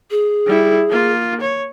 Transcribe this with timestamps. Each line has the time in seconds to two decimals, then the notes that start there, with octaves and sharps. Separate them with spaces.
0.11 G#4
0.46 G3 E4
0.89 A#3 F4
1.41 C#5